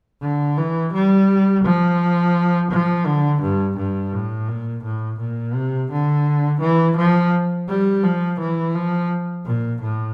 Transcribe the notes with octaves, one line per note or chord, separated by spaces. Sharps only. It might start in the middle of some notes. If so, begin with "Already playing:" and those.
D3
E3
G3
F3
F3
D3
G2
G2
A2
A#2
A2
A#2
C3
D3
E3
F3
G3
F3
E3
F3
A#2
A2